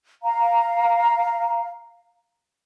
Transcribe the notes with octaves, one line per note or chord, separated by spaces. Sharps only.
F5 A#5